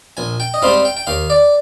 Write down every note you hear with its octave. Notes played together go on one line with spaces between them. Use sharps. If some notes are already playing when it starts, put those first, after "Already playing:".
A#1 G#5
G5
D#5
G#2 G3 C4 F5
G5
G5
D#2 F5
D5